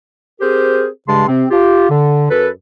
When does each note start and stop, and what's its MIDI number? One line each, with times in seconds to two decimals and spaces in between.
0.40 0.87 60
0.40 0.87 67
0.40 0.87 68
0.40 0.87 70
0.40 0.87 72
1.08 1.25 43
1.08 1.25 49
1.08 1.25 56
1.08 1.25 81
1.08 1.25 84
1.27 1.44 48
1.27 1.44 60
1.50 1.86 65
1.50 1.86 67
1.89 2.26 50
2.30 2.48 42
2.30 2.48 69
2.30 2.48 71